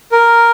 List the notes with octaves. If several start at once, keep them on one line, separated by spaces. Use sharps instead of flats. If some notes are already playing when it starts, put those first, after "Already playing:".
A#4